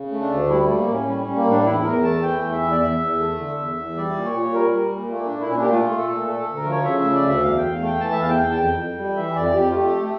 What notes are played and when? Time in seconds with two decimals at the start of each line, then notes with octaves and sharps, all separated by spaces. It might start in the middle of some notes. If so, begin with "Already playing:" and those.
Already playing: C#3
0.12 A3
0.21 D4
0.30 D2
0.49 G3 E4
0.64 A2 A3
0.78 A#3
0.88 A2 C#4
1.07 G3 C#4
1.22 G3 C#4
1.36 A#3
1.46 A2
1.51 D4
1.66 E2 E4
1.84 E2 A#4
2.03 A3 A5
2.22 E3 G5
2.42 E2
2.51 E5
2.62 E2
2.71 D5
2.81 E2 E5
3.00 E2
3.19 A3
3.38 D3
3.57 E2
3.77 E2
3.97 G3 D5
4.16 A#2
4.25 C#5
4.35 A#2
4.54 G3 A#4
4.73 G3
4.92 A#2
5.11 A3 A#3
5.27 A#2 D4
5.40 E4
5.50 A#2 C#4 D4
5.62 G4
5.70 A3 F4
5.89 A3
5.98 A4
6.08 A#2
6.27 A3 A4
6.42 D2 A4
6.56 A#4
6.66 F3
6.71 C#5
6.85 C#3 E5
7.00 A3 E5
7.14 D5
7.24 D2 E5
7.43 E2 F5
7.57 E2 G5
7.72 F5
7.81 A3 G5
8.00 E3 A5
8.12 E5
8.20 E2 F5
8.29 G5
8.40 E2
8.51 A5
8.58 F2 G5
8.77 F2
8.98 G3
9.16 E3 E5
9.36 F2 D5
9.55 F2 G4
9.70 F4
9.74 A3 G4
10.02 A3